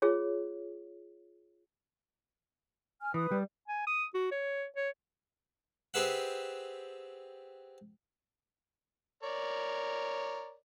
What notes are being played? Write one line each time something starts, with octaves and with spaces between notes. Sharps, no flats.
F4 G#4 C#5
G#5 F6
E3 B4 D#6
G3
G#5
D#6
F#4
C#5
C#5
C4 G4 G#4 B4 E5 F#5
A#4 C#5 D5